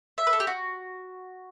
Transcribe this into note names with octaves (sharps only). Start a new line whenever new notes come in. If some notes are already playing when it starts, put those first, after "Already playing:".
E5
B4
A4
G4
F#4